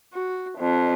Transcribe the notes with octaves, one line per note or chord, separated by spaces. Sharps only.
F#4
F2